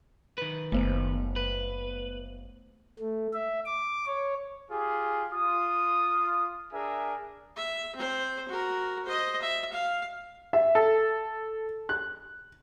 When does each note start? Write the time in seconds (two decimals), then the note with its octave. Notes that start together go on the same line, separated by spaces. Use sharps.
0.38 D#3 B4
0.72 F#1 A3 B3 C5
1.36 B4
3.00 A3
3.33 E5
3.66 D6
4.07 C#5
4.71 F4 G4 G#4
5.32 F4 D#6
6.73 D4 G#4 A#4 E5 G#5
7.56 E5
7.95 C4 C5
8.48 F#4 A#4
9.05 C5 D#5
9.42 E5
9.72 F5
10.53 E5
10.75 A4
11.89 F#6